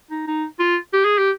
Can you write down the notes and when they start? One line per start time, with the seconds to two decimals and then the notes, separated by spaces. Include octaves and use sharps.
0.11 D#4
0.27 D#4
0.59 F4
0.93 G4
1.05 G#4
1.18 G4